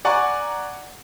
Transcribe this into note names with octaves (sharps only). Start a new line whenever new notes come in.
D5 F#5 G#5 A#5 C#6